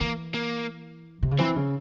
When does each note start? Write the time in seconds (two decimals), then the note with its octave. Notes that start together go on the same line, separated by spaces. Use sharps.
0.01 E3 A#3
0.34 A#3
1.23 C3
1.31 C#3
1.39 E3 C4
1.56 C#3